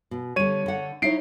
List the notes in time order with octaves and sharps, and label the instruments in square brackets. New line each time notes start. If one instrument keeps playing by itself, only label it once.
[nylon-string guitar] B2
[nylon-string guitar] D3 G3 [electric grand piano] C#5 D#7
[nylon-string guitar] D3 F#5
[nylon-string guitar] D#4 E4 C#5 [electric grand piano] C7 D7